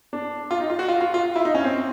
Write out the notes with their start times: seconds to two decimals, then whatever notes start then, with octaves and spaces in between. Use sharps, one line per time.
0.13 D4
0.51 F4
0.60 D#4
0.70 F4
0.79 F#4
0.88 F4
1.01 F4
1.14 F4
1.36 E4
1.45 D#4
1.55 C#4
1.64 C4